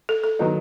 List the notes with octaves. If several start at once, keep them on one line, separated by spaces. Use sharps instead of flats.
A4
A4
D#3 F#3 B3 D#4